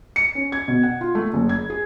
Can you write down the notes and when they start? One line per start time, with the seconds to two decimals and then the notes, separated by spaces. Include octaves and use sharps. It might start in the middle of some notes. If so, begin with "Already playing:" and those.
0.16 C#7
0.35 C#4
0.52 G#6
0.68 B2
0.83 F#5
1.01 F4
1.15 A3
1.33 F#1
1.49 G#6
1.70 G#4